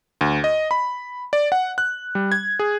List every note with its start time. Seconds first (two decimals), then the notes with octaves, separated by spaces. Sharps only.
0.21 D2
0.44 D#5
0.71 B5
1.33 D5
1.52 F#5
1.78 F#6
2.15 G3
2.32 G#6
2.59 G#4